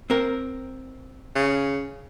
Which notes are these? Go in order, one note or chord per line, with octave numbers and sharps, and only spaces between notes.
C4 A#4
C#3